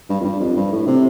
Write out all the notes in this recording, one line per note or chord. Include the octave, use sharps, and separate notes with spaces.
G2
F2
G2
F2
G2
A2
C3